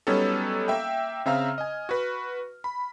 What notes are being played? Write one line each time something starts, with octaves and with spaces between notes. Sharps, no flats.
F#3 G3 B3 C#4 D#4 A4
A#3 E5 G5
C#3 C4 E5 F5 A#5 F6
D#5 G#5
F#4 B4
B5